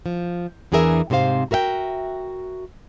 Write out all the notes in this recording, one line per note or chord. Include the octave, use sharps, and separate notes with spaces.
F3
E2 E3 D4 G#4 A#4 E5
G#2 C3 C4 C5 F5
F#4 A#4 E5 F5 G5